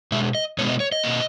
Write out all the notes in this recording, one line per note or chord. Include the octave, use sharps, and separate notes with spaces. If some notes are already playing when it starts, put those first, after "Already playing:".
B2 G#3 E5
D#5
B2 G#3 B3 C#5
D#5
C#5
D#5
B2 A#3